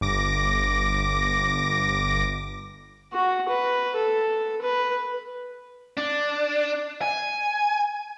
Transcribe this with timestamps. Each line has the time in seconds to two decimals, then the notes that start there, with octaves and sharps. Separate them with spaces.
0.01 G1 D6 A#6
3.13 F#4
3.49 B4
3.96 A4
4.62 B4
5.97 D4
7.01 G#5